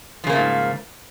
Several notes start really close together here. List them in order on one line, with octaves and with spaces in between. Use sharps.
F3 C#3 A#3 A3 G#2